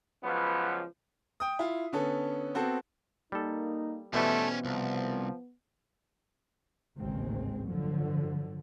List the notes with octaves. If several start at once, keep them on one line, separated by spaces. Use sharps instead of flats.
C#2 F3 F#3 B3 B4
G5 D#6
E4 F4
D3 B3 C#4 A4
B3 C4 F#4 A4
G3 A#3 D#4 A4
B2 E3 G3 A3 B3 C#4 C5
C2 F3
A1 D#2 G#2 C#3 G#3 C4
G2 D3 F3 F#3